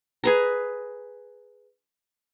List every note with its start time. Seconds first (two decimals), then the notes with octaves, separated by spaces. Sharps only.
0.24 G#4 B4 A#5